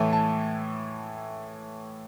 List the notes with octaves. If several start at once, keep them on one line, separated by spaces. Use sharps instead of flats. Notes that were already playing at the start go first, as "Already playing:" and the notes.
Already playing: A2 E3 A3
A5